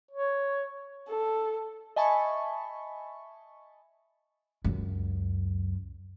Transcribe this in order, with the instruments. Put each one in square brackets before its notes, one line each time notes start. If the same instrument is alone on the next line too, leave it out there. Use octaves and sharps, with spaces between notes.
[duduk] C#5
[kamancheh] A4
[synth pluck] D#5 E5 G#5 A5 B5 C#6
[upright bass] C#2 F#2